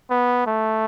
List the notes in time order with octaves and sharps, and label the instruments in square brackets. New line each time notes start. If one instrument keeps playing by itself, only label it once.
[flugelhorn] B3
A3